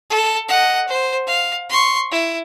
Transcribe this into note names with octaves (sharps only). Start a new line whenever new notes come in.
A4
D#5 F#5
C5
F5
C6 C#6
E4